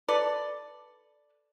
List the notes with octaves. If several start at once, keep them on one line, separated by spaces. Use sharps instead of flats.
A4 B4 D5